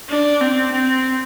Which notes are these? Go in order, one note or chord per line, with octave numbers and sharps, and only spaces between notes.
D4
C4
C4